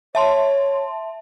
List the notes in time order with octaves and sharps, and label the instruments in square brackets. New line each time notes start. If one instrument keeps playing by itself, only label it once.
[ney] C#5 [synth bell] E5 A5 C6